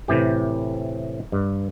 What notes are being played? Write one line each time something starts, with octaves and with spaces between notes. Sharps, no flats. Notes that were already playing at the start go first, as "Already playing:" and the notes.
A2 C3 E3 G4
G2